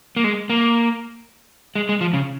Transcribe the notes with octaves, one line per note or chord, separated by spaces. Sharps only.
A#3
G#3
A#3
G#3
G#3
F3
C#3